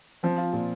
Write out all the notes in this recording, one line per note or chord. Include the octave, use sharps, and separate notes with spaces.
F3 C4
F4
A#2